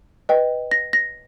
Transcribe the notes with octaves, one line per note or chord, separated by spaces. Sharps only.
B4 D#5 G5
A#6
A#6